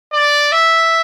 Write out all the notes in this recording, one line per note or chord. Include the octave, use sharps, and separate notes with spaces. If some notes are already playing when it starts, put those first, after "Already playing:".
D5
E5